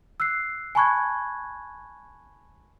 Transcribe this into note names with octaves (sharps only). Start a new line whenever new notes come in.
E6 F#6 C7
G#5 A5 B5 C#6 F#6 G#6